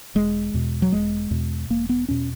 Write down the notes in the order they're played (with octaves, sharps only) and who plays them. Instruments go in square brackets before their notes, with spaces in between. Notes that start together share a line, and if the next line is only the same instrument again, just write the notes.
[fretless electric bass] E1 G#3
E2 B2
F#3
E1 G#3
E2 B2
E1 A#3
B3
E2 B2 C#4